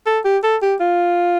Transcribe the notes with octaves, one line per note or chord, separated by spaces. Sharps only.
A4
G4
A4
G4
F4